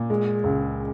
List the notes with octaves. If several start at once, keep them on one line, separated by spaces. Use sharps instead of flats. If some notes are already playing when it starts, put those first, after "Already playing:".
Already playing: A#2
G#3
C#2